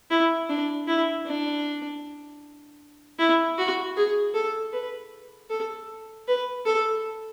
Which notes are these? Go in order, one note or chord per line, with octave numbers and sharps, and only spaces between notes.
E4
D4
E4
D4
E4
F#4
G#4
A4
B4
A4
B4
A4